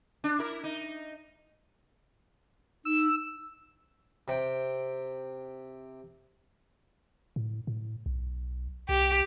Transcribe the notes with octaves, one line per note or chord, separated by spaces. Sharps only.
D4
E4 A#4
D#4
D#4 E6
C3 G5
A2
A2
B1
C2 G4